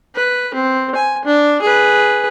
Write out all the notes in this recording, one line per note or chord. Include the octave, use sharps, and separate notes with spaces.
B4
C4
G#5
D4
G#4 B4